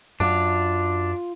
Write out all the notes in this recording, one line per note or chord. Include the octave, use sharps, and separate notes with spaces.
F#2 D4 F4